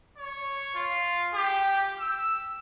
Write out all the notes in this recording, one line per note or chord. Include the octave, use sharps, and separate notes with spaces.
C#5
F4
G4
E6